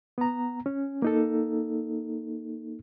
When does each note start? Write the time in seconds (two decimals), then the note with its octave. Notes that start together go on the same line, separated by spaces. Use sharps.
0.18 B3 A#5
0.66 C#4
1.02 A#3 D#4 A4